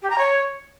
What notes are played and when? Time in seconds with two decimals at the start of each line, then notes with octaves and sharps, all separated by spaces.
0.02 G4
0.10 A#5
0.18 C#5